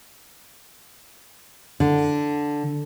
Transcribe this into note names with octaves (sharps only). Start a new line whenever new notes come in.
D3